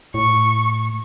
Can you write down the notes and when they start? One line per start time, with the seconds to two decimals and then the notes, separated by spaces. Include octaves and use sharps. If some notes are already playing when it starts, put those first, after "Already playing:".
0.14 A2 C#6